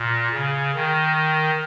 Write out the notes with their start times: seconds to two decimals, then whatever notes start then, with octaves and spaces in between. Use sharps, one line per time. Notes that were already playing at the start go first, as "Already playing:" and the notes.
Already playing: A#2
0.33 C#3
0.75 D#3